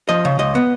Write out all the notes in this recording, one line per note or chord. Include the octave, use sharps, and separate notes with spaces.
F3 D#5
C#3
C#2 D#5
B3